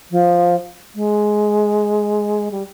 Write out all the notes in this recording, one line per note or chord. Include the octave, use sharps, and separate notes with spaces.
F3
G#3
G3